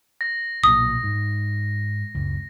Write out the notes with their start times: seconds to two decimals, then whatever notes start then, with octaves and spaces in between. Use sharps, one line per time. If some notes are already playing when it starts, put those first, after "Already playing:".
0.21 A#6
0.64 B1 A#2 D#6
1.03 G#2
2.15 F#1 C#2